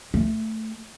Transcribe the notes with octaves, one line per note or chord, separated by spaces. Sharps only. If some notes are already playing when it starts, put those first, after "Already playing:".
A3